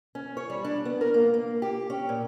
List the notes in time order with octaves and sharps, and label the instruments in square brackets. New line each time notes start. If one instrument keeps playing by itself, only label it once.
[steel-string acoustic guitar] C#4
C#5
G3
D4
B3
A#4
A#3
A#3
G4
C#4
A#2